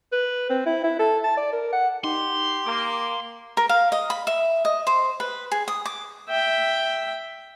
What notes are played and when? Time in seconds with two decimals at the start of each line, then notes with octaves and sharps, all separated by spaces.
0.12 B4
0.50 C4
0.66 E4
0.84 E4
0.99 A4
1.24 A5
1.37 D5
1.53 A#4
1.72 F#5
2.04 D#4 G4 C6
2.66 A#3 D6
3.57 A#4
3.69 F5
3.92 D#5
4.10 B5
4.27 E5
4.65 D#5
4.87 C5
5.20 B4
5.52 G#4
5.68 D#6
5.86 D6
6.29 E5 G5